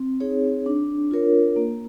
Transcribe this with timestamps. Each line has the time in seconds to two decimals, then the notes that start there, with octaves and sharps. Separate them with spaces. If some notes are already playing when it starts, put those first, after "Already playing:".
Already playing: C4
0.20 D#4 G#4 C#5
0.66 D4
1.11 F4 A#4 C#5
1.56 A#3